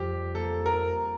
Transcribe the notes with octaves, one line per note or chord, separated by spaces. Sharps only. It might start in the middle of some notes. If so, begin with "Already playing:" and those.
Already playing: F2 G3 G4
A#3 A4
A#4